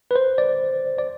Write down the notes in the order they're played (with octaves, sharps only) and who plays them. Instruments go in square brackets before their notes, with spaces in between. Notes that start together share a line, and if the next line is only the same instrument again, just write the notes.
[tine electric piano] B4
C5
D5
D5